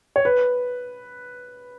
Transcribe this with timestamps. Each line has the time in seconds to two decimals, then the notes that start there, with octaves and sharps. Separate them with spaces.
0.16 C#5
0.25 B4